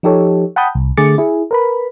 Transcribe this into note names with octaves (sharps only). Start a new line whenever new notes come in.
F3 D#4 G4 A4 C#5
F#5 G5 A5 B5 D#6 G6
C2
D3 A3 G#4 D6 A6 C#7
E4 G#4
A#4 B4 B5